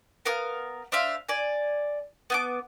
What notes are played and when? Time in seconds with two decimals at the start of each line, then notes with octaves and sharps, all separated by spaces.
0.25 B3 A#4 F5 F6
0.92 D4 C5 E5 F5
1.29 D5 G#5
2.30 B3 G#5 D6